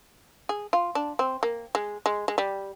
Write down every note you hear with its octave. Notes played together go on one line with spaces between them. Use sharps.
G#4
F4
D4
C4
A#3
G#3
G#3
G#3
G3